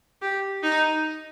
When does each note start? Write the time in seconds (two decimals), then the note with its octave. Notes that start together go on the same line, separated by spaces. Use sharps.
0.22 G4
0.63 D#4